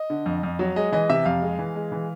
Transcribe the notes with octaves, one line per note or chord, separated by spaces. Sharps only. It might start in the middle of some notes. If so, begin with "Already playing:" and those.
Already playing: D#5
D3
F2
F2
F#3
G#3 D#5
E3 D#5
C3 E5
F2 F5
G#3
E3
G#3
E3